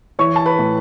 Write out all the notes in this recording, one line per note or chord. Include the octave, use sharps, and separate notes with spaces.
E3 C#5 C#6
A5
B4 B5
A2